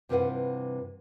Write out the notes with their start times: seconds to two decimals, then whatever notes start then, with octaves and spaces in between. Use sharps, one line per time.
0.09 G2 C3 E3 F4 B4 F#5